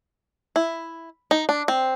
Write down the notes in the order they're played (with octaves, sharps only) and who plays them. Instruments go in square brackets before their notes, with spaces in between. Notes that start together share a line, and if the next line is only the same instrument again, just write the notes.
[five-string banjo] E4
D#4
D4
C4